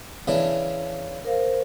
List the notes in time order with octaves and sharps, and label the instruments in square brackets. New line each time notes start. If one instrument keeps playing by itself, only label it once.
[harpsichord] C#3 E3 D4
[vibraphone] A#4 C5 F5